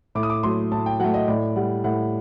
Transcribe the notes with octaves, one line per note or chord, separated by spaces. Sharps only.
A2 D6
D#6
D6
F#3 A3 C6
A2 A5
G5
F#3 A3 F#5
D#5
A2 D5
G3 F#5
A2 F#5